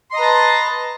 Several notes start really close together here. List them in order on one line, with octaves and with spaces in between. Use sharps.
C6 D#5 A#5 B4 A5